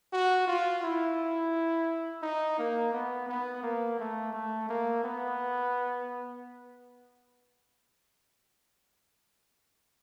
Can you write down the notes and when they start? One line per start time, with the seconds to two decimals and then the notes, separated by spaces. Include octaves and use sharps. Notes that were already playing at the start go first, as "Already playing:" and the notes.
0.13 F#4
0.48 F4
0.83 E4
2.22 D#4
2.59 A#3
2.93 B3
3.29 B3
3.63 A#3
3.99 A3
4.33 A3
4.69 A#3
5.04 B3